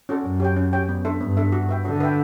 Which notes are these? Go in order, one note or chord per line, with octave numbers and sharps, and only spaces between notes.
C#4 F#4 A4 D5
F#2 C#4
G4 C#5 G5
C#4
G4 C#5 G5
B3
D4 A4 E5
G2 B3
D4 A4 E5
F#4
B4 E5 G5
D3 F#4
B4 E5 G5